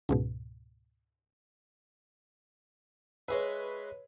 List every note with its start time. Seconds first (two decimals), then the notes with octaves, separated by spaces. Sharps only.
0.09 C#2 G#2 B2
3.28 G#3 G#4 B4 C#5 E5